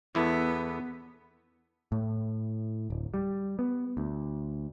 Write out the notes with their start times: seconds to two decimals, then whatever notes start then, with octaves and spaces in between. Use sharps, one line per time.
0.15 E2 B3 E4 A4
1.92 A2
2.90 D1
3.14 G3
3.59 B3
3.97 D2